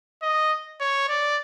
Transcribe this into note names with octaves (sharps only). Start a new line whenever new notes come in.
D#5
C#5
D5